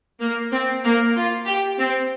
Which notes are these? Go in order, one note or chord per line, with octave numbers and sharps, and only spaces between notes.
A#3
C4
A#3
F4
G4
C4